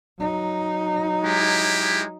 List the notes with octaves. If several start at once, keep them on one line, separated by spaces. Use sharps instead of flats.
F#3 D#4
G#3 E4 G4